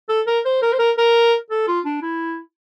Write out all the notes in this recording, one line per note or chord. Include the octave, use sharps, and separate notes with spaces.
A4
A#4
C5
A#4
C5
A#4
A#4
A4
F4
D4
E4